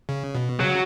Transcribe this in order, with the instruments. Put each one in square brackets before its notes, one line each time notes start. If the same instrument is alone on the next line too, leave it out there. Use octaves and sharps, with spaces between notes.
[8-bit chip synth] C#3
B2
[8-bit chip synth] C#3 [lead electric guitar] F#3